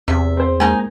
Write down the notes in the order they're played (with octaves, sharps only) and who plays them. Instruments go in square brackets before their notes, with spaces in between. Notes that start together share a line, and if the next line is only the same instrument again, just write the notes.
[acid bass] E2 [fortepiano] C3 [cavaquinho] E5
[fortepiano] C4 C5
[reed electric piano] G#3 A#3 [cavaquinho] D#4 G#5